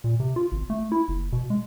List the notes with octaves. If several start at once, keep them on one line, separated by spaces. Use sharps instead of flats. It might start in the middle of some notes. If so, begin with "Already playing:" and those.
A#2
C3
F4
G#1
A3
E4
F#1
B2
G#3